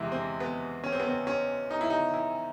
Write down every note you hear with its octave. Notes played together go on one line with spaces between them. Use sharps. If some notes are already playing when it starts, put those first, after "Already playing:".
Already playing: E2 C3 E3 G#3 E4
C4
B3
C#4
C4
B3
C4
C#4
D#4
E4
D#4
E4